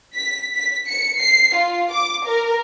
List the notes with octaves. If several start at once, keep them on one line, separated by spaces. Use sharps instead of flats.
B6
B6
C#7
C7
F4
D6
A#4